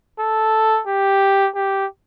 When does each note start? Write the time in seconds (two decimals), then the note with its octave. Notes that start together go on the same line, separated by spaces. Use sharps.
0.19 A4
0.87 G4
1.55 G4